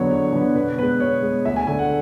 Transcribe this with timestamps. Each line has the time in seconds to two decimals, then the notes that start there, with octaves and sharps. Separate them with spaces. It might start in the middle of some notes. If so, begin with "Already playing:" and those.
Already playing: E2 D3 F#3 B3 C#5
0.10 E2 C#5
0.33 D3 F#3 B3
0.55 B2 B4
0.78 G#3 B3 B4
1.00 B2 C#5
1.22 G#3 B3
1.45 D2 E5
1.56 G#5
1.67 D3 A3 G#5
1.79 F#5